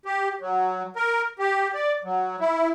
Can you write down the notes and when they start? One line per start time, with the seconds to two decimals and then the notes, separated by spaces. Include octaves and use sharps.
0.05 G4
0.41 F#3
0.96 A#4
1.39 G4
1.74 D5
2.04 F#3
2.40 E4